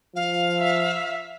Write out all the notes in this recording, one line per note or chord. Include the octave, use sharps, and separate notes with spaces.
F3 F5
E5